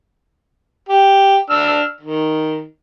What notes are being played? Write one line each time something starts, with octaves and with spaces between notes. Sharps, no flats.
G4
D4 E6 F6
D#3